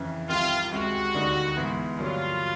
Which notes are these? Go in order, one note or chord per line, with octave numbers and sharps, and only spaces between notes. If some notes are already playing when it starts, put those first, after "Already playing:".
Already playing: F2 C#3 E3
C2 C3 D#3 F4
C#2 C3 D#3 G#3 F#4
D2 D3 G3 A#3 D#4
G#2 E3 G#3 B3
G2 D3 F#3 A#3 F4